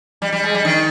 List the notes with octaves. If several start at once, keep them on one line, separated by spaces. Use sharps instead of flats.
G3
G3
G#3
G3
D#3